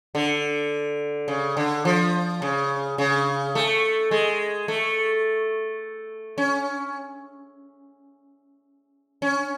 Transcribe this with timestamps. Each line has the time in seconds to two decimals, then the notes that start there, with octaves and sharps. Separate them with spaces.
0.15 D3
1.28 C#3
1.57 D3
1.85 F3
2.42 C#3
2.98 C#3
3.55 A3
4.11 G#3
4.68 A3
6.38 C#4
9.22 C#4